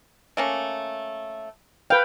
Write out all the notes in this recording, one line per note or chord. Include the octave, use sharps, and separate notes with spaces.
A3 A#3 C#4
B4 F5 G5